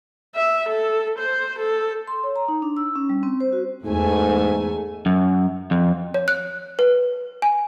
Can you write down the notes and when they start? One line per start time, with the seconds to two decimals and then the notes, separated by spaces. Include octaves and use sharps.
0.35 E5
0.69 A4
1.19 C5
1.59 A4
2.07 C6
2.24 C#5
2.36 A#5
2.48 D#4
2.62 D4
2.77 E6
2.95 C#4
3.09 G3
3.23 C4
3.40 C5
3.53 F#4
3.85 E2 G#2 A3 G#5
5.06 F#2
5.71 F2
6.14 C#5
6.28 F#6
6.79 B4
7.42 G#5